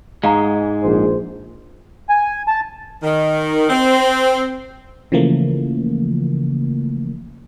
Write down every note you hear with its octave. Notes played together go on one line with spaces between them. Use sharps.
G#2 G#3 F5 F#5 A#5
A#1 G#4 C5
G#5
A5
D#3
C4
C#3 E3 F3 A3 A#3